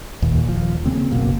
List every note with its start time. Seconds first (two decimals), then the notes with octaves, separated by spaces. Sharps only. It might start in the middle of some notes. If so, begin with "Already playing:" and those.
0.22 D#2 A#2
0.45 D#1 F3
0.86 C#3 A#3 C4
1.11 F#1 B1 B2 A#3